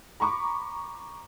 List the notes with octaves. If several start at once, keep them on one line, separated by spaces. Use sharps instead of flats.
A#5 B5 C#6 D6